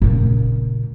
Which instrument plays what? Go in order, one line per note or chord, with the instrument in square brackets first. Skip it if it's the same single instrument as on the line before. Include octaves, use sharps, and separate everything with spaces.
[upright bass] A#2 C#3